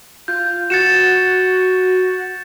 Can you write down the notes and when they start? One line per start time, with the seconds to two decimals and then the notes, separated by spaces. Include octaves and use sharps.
0.28 F4 G6
0.70 F#4 A6 C#7 E7